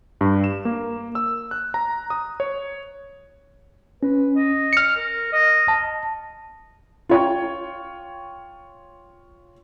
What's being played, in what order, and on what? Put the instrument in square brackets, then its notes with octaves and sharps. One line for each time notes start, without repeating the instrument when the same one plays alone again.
[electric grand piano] G2
E7
A#3
E6
F#6
A#5
D#6
C#5
[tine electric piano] C#4 [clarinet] B4
[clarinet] D#5
[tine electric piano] F6 C#7
[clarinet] A#4
D#5
[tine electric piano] A5
[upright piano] F4 C#5 G5